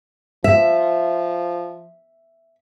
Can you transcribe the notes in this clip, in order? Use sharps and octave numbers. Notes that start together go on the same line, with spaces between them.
F3 E5